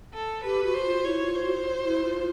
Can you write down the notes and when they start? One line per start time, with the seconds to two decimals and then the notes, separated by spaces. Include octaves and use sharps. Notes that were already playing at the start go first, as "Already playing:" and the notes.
0.14 A4
0.44 G4 B4
0.64 F#4
0.74 C5
0.85 F4
1.05 E4 C#5
1.25 F4
1.35 C5
1.45 F#4
1.85 E4
2.05 F4